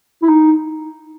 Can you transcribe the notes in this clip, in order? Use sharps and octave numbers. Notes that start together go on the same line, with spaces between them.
E4
D#4